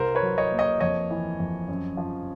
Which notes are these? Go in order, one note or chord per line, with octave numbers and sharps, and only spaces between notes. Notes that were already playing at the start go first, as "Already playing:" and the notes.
Already playing: C2 A#4 C5
B4 C#5
F#3
C#5 D#5
A#3
C#5 D#5
F2 C#5 D#5
E3
F2
F#2
F3